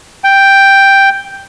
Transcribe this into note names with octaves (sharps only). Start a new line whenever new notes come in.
G5